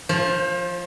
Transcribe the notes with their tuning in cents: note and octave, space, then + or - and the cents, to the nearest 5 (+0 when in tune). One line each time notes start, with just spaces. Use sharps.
F3 +0 C5 +35